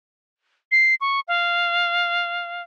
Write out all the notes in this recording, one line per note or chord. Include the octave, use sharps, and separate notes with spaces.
C7
C#6
F5